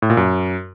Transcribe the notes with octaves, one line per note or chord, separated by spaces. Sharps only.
A2
A#2
F#2